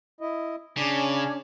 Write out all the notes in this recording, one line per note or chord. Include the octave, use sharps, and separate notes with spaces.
E4 D#5
C#3 C#4 D4 G#5 D6 G#6